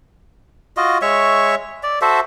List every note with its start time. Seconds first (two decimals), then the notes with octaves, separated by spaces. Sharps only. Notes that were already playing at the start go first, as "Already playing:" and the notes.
0.77 F4 F#4 D#5
1.02 G#3 C#5 E5 C#6
1.83 D5
2.01 F#4 A4 C5 E5